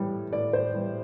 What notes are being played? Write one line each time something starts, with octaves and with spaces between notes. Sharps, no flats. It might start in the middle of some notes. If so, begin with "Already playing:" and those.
Already playing: A2 E3 G3
A2 D5
C5
E3 G3